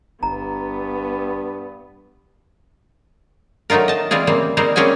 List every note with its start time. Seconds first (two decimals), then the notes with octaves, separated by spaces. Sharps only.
0.23 G1 G2 B3 A#5
3.70 F#3 A3 D#4 F4 A#4
3.88 D#5 A5
4.11 E3 G3 C4 F4 G#4
4.27 C#3 G3 A#3 C4
4.57 G3 C4 D#4 G#4 A#4 C5
4.76 A#3 C4 C#4 G#4 G5 G#5